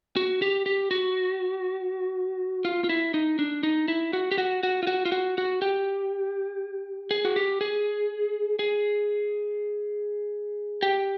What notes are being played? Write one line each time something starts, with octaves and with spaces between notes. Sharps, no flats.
F#4
G4
G4
F#4
F4
F4
E4
D#4
D4
D#4
E4
F#4
G4
F#4
F#4
F4
F#4
F4
F#4
F#4
G4
G#4
F#4
G4
G#4
G#4
G4